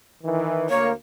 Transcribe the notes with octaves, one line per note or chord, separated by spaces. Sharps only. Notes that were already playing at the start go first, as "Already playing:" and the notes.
D#3 E3
D2 A#3 C#5